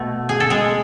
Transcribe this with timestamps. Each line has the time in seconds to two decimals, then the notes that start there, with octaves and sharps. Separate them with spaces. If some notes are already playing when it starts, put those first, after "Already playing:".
Already playing: B2 A3
0.29 G#4
0.40 A4
0.50 G#3 G#4